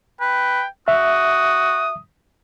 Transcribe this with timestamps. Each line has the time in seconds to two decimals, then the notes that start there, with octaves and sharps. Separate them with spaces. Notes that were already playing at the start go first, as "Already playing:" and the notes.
0.21 B4 G5
0.88 F#4 E5 D#6